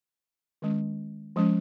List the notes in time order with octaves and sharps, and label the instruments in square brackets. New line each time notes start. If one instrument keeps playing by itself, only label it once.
[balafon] D#3 G#3 C#4
F3 G#3 C#4